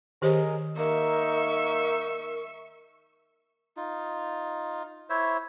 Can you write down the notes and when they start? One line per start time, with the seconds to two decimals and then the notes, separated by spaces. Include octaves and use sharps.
0.22 D#3 G4 G#4 A#4 C5 D#5
0.77 A#3 D#4 A#4 E5 C#6
3.77 D#4 F4
5.10 E4 C5 C#5 E5